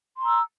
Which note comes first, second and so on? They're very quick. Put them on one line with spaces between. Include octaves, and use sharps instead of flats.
C6 A#5 E6